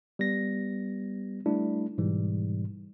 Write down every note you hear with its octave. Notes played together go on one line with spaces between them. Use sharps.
G3 B3 A#6
G3 A3 D4 E4
G#2 B2 E3 G3